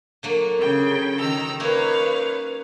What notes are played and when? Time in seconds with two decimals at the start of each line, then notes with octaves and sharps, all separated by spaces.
0.23 D3 F#3 A#3
0.58 C#3 G5
1.19 D#3 A#5 E6
1.60 A#3 C#4 D#4 B4 C#5 F5